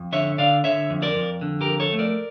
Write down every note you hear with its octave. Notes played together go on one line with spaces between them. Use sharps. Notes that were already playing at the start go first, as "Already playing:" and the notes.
Already playing: F2
D3 C#5 E5
D3 D5 F5
D3 C#5 E5
F2
A#4 D5
F2
D3
G4 A#4
F2
A4 C#5
A3
A#4 D5